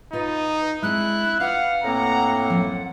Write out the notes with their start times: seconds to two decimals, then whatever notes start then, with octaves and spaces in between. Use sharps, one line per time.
0.12 B2 D#4 F4 B4
0.82 G#3 C4 D4 E4 F#6
1.40 D4 F4 B4 F5 F#5
1.84 A2 A#3 C4 A#5
2.48 F#2 F3 C5